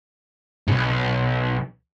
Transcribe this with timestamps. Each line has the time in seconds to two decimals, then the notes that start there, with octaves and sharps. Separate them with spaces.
0.68 B1 G#2